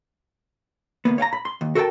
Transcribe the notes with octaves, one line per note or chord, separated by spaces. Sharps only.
D2 A#2 A#3 B3
C#5 F5 G5 A#5
B5
C6
D#2
F#4 A4 A#4 E5 G5 A5